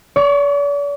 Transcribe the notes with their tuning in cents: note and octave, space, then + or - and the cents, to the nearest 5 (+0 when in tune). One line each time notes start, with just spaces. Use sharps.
D5 -45 C#6 +0